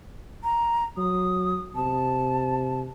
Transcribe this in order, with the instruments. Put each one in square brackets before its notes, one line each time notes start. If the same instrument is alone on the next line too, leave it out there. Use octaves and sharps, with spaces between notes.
[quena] A#5
[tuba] F#3 [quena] D#6
[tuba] C3 [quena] A5